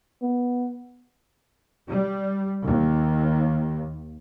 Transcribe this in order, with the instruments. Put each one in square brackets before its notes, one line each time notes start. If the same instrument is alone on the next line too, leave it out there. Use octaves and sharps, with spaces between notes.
[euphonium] B3
[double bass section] G3
D#2